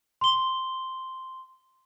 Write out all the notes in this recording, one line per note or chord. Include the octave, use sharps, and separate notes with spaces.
C6 G7